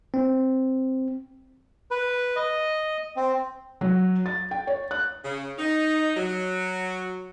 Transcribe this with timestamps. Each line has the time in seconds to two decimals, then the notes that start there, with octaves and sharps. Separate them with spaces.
0.14 C4
1.91 B4
2.36 D#5
3.16 C4
3.81 F#3
4.26 A6
4.51 G5
4.67 C#5
4.91 F#6
5.24 C#3
5.58 D#4
6.16 F#3